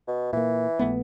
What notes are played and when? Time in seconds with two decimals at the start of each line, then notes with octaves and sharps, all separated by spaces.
0.08 B2
0.33 A#2 E3 A#3
0.79 A#1 A3 B3